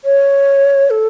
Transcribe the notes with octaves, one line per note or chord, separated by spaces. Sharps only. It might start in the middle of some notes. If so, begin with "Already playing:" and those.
C#5
A4